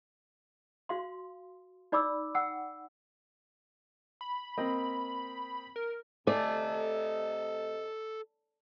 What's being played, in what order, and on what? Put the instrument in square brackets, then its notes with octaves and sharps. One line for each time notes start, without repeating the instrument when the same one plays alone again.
[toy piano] F#4 F5 C6
D#4 D5 B5 D6 E6
F#5 G5 E6
[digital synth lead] B5
[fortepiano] A#3 C4 D#5
[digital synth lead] A#4
[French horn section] C3 D#5 [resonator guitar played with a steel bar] A3 [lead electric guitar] A4 G#5 [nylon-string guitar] D5